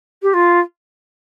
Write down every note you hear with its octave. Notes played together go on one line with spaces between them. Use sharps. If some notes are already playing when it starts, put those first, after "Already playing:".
G4
F4